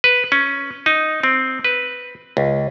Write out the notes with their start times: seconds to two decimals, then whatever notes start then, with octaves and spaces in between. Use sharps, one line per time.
0.04 B4
0.32 C#4
0.86 D#4
1.23 C4
1.65 B4
2.37 C#2